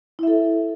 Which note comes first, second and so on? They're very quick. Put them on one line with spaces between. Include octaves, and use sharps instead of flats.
E4 E5 A4